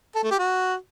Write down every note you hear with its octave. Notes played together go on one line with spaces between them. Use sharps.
A4
A3
G4
F#4